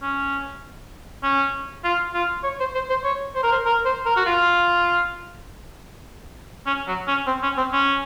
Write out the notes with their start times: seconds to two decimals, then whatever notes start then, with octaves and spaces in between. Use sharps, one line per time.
0.02 C#4
1.23 C#4
1.84 F4
2.14 F4
2.44 C#5
2.60 C5
2.75 C5
2.89 C5
3.04 C#5
3.35 C5
3.43 A#4
3.52 C5
3.66 A#4
3.85 C5
4.06 A#4
4.16 F#4
4.26 F4
6.66 C#4
6.87 F#3
7.08 C#4
7.27 C4
7.43 C#4
7.57 C4
7.72 C#4